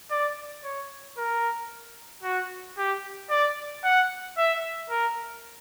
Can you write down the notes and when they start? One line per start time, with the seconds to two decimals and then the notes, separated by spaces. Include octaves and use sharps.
0.11 D5
0.64 C#5
1.17 A#4
2.23 F#4
2.78 G4
3.30 D5
3.84 F#5
4.37 E5
4.90 A#4